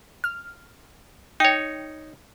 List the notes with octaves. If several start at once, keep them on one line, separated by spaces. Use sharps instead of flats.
F6
D#4 C#5 G5 A#6